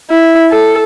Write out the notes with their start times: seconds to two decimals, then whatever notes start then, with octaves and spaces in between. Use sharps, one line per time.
0.11 E4
0.51 A4